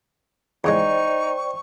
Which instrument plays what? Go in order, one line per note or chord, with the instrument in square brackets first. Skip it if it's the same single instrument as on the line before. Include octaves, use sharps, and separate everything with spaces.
[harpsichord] E2 C#3 G#3 [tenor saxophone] D#4 [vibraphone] C5 D5 G5 [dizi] C#6